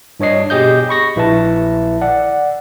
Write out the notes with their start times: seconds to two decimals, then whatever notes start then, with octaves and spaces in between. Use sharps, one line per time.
0.20 G2 D4 C#5 D#5 C7
0.50 B2 G4 G#4 D#5 G6
0.89 B5 C#6 A#6
1.16 A#1 E4 B4 E5 A5
2.02 D5 F#5